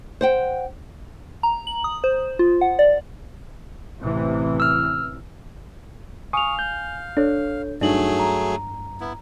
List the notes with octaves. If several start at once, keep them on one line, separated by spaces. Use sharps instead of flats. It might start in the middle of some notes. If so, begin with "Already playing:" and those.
C5 F#5 G5
A#5
F#7
D#6
C5
F4
F#5
D5
A1 C3 E3
E6 F6
F5 G#5 C#6 D#6 F7
G6
D4 A4 C#5
G2 F#3 A3 D4 D#4 G#4 F#7
A#5
B3 E4